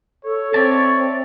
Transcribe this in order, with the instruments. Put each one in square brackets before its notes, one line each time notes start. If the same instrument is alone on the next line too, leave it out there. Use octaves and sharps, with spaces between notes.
[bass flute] A4 [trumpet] C#5
[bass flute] C4 [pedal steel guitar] D5 E5 A5